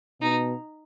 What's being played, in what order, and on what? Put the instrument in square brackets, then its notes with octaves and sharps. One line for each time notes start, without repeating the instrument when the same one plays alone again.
[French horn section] B2 [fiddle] D#4